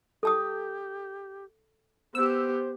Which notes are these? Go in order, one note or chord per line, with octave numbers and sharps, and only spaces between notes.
G4 A4 A5 D#6
B3 G4 C5 E6